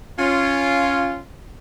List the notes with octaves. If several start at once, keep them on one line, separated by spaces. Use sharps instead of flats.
C#4 F4